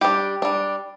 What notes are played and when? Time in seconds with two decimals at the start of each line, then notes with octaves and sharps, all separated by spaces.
0.01 G3 D4 G4
0.42 G3 D4